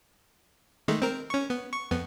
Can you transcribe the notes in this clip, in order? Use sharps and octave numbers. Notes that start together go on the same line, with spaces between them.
D#3 G#3 A3
C4 A#4
C#4 C#6
B3
C#6
F2 B3